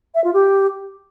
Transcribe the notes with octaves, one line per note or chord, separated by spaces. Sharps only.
E5
F4
G4